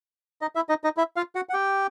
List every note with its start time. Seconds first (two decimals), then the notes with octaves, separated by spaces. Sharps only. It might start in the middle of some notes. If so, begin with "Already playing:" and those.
0.41 D#4 D#5
0.55 E4 E5
0.69 D#4 D#5
0.84 D#4 D#5
0.97 E4 E5
1.16 F4 F5
1.35 F#4 F#5
1.49 F#5
1.53 G4 G5